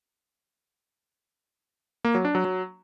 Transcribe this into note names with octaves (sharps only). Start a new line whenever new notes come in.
A#3
F#3
D4
F#3
F#3